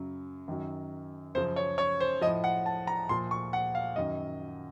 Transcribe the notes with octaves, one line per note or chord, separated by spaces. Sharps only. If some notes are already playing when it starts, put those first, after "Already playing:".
Already playing: F#2 C#3 F#3
F#2 D#3 F#3
F#2 C#3 F3 C5
C#5
C#5
C5
A2 F3 D#5
F#5
A5
A#5
A#2 F3 C6
C#6
F#5
F5
F#2 D#3 F#3 D#5